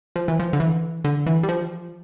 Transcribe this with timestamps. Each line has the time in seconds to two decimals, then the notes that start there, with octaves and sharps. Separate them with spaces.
0.16 F3
0.28 E3
0.40 F3
0.53 D3
0.60 E3
1.05 D3
1.26 E3
1.43 G3
1.49 F3